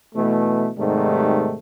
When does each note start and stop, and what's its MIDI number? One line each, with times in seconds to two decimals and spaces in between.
0.14 0.69 47
0.14 0.69 52
0.14 0.69 57
0.77 1.57 44
0.77 1.57 48
0.77 1.57 51
0.77 1.57 55
0.77 1.57 57